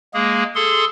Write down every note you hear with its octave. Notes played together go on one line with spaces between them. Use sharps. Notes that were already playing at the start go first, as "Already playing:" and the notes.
G#3 A#3 G#4
G#4 A4 C6